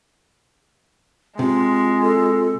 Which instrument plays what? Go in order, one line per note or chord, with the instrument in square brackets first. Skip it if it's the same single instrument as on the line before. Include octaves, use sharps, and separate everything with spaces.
[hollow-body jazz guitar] C3 [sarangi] G#3 [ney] F4
[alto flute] A4